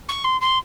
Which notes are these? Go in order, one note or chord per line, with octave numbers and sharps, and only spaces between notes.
C#6
C6
C6